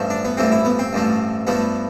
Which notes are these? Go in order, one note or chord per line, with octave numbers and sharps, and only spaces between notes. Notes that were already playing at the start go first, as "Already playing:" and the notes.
Already playing: A1 G2 F3 A3
D4
B3
A1 G2 F3 A3 C4
E4
B3
C4
A1 G2 F3 A3
G2 F3 A3 B3